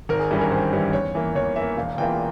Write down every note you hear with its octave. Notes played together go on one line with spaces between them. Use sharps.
G#1 A#4
G#4
G2 E3 G3 C#4 G#4
A#4
G#1 C5
G2 E3 G3 C#4
E2 C#5
E3 A#3
E2 C#5
E3 E5
A#3
E1 F5
E2 E3 A#3 F4 G5